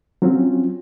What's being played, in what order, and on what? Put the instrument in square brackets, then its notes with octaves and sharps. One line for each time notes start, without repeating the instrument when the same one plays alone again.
[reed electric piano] F#3 C4 C#4 F4 F#4